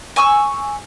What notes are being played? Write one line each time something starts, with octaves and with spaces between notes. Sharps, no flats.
G#5 C#6 D#6 E6